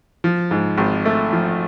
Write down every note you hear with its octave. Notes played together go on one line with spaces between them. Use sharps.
F3
G#2
G#1
A3
F3